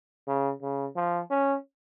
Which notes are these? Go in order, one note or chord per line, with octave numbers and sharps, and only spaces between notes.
C#3
C#3
F3
C#4